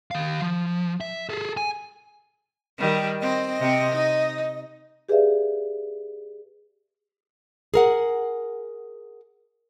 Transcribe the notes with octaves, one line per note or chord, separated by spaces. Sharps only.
D#3 F5
F3
E5
G#4 A4
G#5
D#3 G3
C4 D#5
C3 C4
D#4
G4 G#4 B4 D5 E5 F5
G#4 A#4 F#5